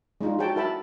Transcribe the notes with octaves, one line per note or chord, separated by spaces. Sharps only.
G#3 D4 D#4 F4
F#4 G#4 C#5 G5 A5
E4 F#4 A#4 E5 A5 B5